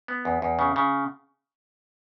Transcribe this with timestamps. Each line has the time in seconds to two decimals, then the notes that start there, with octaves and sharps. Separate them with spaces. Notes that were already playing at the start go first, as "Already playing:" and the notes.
0.08 B3
0.25 E2
0.42 E2
0.59 C#3
0.76 C#3